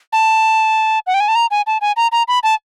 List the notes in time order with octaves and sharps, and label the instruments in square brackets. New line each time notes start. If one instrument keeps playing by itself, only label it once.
[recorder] A5
F#5
G5
G#5
A5
A#5
G#5
A5
G#5
A#5
A#5
B5
A5